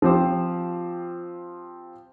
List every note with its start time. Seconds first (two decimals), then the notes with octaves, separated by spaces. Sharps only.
0.02 F3 C4 G4 C5